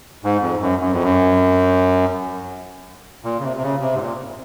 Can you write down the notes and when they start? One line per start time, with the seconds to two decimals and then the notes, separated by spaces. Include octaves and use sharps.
0.24 G#2
0.42 F2
0.62 F#2
0.80 F#2
0.92 F2
1.03 F#2
3.24 A#2
3.39 C#3
3.44 C3
3.57 C3
3.63 C#3
3.82 C3
3.95 G#2
4.00 A#2